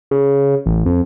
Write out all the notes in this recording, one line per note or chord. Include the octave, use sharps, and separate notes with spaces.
C#3
A1
F2